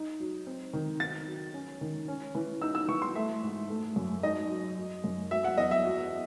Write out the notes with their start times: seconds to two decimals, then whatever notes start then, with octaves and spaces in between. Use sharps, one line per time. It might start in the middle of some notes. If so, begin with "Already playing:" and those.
Already playing: D#4
0.20 F#3
0.47 C4
0.73 D#3
1.00 D#4 A6
1.27 F#3
1.54 C#4
1.81 D#3
2.08 C#4
2.35 E3
2.62 D#4 E6
2.75 E6
2.88 E3 C#6
3.02 C6
3.15 A3 E5
3.43 G#2
3.70 A3
3.96 F#2
4.23 D#4 D#5
4.50 F#3
4.78 F#3
5.04 F#2
5.31 F#3 E5
5.44 F#5
5.57 E2 D#5
5.71 E5
5.85 F#3